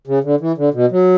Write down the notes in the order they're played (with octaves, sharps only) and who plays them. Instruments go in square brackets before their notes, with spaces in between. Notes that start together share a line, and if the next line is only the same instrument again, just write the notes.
[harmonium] C#3
D3
E3
D3
B2
F#3